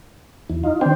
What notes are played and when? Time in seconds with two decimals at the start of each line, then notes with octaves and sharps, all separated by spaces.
0.50 E2 E4
0.64 D#4 F4
0.81 D#3 C4 D4 C5 G5